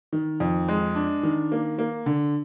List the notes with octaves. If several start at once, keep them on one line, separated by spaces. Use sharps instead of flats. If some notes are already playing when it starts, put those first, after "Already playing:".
D#3
F2
G#3
D4
D#3
A#3
A#3
D3